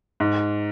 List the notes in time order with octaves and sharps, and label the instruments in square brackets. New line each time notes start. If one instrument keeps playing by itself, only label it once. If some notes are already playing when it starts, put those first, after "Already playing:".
[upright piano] G#2